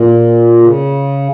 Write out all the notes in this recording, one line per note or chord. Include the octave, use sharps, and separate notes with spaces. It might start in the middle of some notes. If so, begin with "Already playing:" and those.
Already playing: A#2
C#3